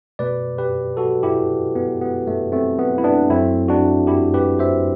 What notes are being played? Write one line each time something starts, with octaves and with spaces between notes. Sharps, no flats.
B2 A3 B4 D5
G4 B4
F#4 A4
E4 G4
B3
B3
A3
A3 C4
B3
E4
B3 D4
F#2 F#3 A3 C4 E4
D4 F#4
E4 G4
G4 B4
C5 E5